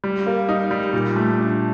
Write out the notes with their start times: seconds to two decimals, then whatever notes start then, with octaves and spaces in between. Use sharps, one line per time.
0.04 G3
0.27 A#3
0.49 D#4
0.71 G3
0.93 A#2
1.16 A3
1.38 D4